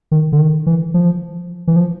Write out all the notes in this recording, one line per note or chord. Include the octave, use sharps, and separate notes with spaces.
D#3
D3
D#3
E3
F3
E3
F3